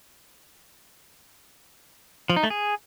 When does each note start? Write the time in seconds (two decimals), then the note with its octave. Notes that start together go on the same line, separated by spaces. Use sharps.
2.30 F3
2.36 D#4
2.43 A3
2.50 G#4